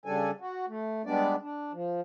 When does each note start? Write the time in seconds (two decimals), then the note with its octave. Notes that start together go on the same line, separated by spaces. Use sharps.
0.06 C#3 G3 D4 A4 G#5
0.40 F#4
0.68 A3
1.06 G3 G#3 B3 D4 D5
1.41 D4
1.72 F3